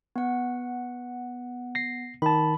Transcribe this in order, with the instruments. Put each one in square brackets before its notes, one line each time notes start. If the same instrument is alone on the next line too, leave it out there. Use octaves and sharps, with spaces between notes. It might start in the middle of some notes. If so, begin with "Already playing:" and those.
[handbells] B3 F#5
[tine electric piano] A#6 C7
[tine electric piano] D#3 A5 [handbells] B5